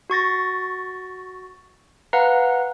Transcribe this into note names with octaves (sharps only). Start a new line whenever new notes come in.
F#4 C#6 A6 A#6
B4 F5 F#5 A#5